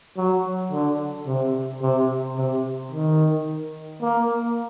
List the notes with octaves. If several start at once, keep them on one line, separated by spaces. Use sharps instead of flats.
F#3
D3
C3
C3
C3
D#3
A#3